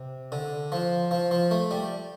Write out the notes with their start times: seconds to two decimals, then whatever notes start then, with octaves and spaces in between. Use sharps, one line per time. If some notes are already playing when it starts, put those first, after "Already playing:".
Already playing: C3
0.32 D3
0.72 F3
1.11 F3
1.31 F3
1.51 A3
1.71 G3